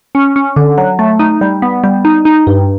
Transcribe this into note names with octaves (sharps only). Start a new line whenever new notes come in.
C#4
C#4
D3
F#3
A3
D#4
G3
B3
G3
D#4
D#4
G2